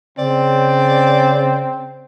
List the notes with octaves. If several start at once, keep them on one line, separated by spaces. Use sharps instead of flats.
C#3 C4 D5